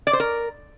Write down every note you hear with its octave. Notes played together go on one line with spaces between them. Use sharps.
D5
C5
A#4